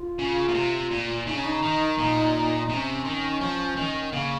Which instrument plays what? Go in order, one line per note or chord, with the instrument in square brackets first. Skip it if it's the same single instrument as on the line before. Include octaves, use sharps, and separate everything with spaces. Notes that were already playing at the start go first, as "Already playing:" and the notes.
Already playing: [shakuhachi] F4
[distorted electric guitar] C#3
A#2
C3
A#2
[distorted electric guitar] C#3 [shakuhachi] D#4
[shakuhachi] C#4
D#4
[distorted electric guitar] D#3
A#2
[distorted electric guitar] C3 [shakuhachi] C#4 D#4
[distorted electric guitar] D#3
F3
D#3
[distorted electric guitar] C#3 [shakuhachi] A#3